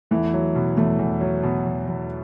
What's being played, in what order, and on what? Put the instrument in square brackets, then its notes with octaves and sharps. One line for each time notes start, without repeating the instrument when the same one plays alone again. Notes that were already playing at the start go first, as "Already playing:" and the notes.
[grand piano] E2 [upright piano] E3 A3
[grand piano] F#3
B2
[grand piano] E2 [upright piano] E3 A3
[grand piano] E2
F#3
B2
E2
E2